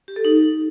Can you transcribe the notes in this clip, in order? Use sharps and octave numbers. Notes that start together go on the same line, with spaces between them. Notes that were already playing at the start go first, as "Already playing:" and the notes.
G4
A4
D#4